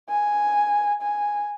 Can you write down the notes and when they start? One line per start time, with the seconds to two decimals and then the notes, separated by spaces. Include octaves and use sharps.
0.09 G#5
1.02 G#5